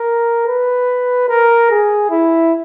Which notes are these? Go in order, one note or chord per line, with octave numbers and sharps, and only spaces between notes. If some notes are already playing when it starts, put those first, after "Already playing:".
Already playing: A#4
B4
A#4
G#4
E4